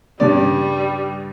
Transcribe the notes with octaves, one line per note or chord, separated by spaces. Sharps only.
G2 C#3 G3 D5